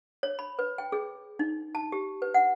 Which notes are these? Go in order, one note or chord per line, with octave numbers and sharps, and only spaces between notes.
C#5
B5
B4
G5
G#4
D#4
A5
G4
B4
F#5